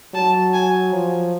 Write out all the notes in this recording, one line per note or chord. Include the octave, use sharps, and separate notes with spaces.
F#3 A5
G#5
F3